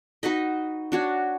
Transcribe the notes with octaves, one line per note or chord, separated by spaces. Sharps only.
D#4 F#4 B4 D#5
D4 F#4 C#5